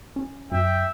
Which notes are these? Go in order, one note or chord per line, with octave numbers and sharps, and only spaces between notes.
C#4
F#2 E5 G5